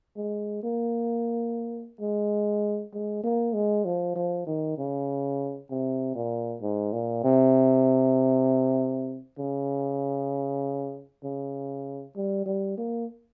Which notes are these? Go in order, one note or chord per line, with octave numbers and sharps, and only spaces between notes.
G#3
A#3
G#3
G#3
A#3
G#3
F3
F3
D#3
C#3
C3
A#2
G#2
A#2
C3
C#3
C#3
G3
G3
A#3